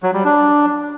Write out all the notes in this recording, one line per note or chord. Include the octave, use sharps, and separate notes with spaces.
F#3
G3
D4